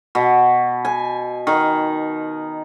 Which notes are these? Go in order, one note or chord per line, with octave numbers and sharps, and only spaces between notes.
B2
G#5
D#3